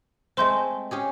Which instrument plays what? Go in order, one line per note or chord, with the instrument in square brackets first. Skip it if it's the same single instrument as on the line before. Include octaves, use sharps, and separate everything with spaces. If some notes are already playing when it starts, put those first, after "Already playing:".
[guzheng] G#3 A3 C4 [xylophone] C5 C6 G6
[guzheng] C#4 G4 G#4